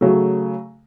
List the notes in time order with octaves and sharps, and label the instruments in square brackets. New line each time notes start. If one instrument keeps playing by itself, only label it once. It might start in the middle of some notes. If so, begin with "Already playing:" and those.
[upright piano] C#3 F#3 A3